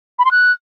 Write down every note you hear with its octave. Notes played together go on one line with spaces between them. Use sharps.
B5
C6
F#6